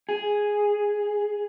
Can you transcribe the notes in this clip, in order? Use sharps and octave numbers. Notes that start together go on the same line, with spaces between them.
G#4